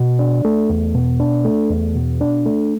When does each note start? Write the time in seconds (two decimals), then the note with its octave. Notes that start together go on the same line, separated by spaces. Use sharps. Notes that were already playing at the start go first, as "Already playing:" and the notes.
Already playing: B2
0.19 D4
0.44 A3
0.69 E2
0.94 B2
1.20 D4
1.45 A3
1.70 E2
1.95 B2
2.21 D4
2.45 A3